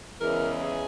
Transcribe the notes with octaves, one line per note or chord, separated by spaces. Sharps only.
E2 C#3 E3 G#3 A#4
G#4